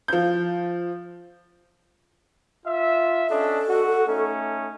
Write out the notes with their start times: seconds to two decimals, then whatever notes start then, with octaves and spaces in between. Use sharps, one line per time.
0.08 F3 G6
2.66 F4 E5
3.29 C#4 D4 A4 D#5
3.67 F#4
4.07 A3 C#4 D#4